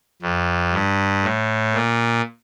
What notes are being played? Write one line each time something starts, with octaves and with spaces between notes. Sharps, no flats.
F2
G2
A2
A#2